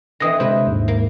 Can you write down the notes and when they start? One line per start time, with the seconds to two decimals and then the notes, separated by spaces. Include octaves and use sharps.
0.20 D3 E3 C4 D#5 D#6 A#6
0.40 C3 G#3 E4 B4 C5
0.67 D#2 G#2
0.88 A#3